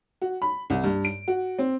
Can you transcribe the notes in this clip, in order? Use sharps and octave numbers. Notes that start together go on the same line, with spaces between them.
F#4
B5
C2
G2
D7
F#4
C4